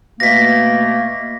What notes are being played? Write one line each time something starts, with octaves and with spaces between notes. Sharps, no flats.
B2 A3 A#3 A#6 B6